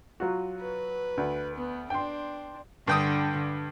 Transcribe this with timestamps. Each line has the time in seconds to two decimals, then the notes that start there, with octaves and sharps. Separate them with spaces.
0.20 F#3 F4 F#4
0.60 B4
1.17 D2
1.55 B3
1.90 D4 G5 C6
2.87 G2 D3 G5 D#6